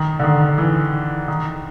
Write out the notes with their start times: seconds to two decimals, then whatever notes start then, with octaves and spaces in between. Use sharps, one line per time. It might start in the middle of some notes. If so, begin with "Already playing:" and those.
Already playing: D#3
0.19 D3
0.24 D#3
0.58 E3
1.28 D#3